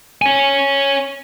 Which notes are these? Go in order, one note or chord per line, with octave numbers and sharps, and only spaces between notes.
C#5 G#5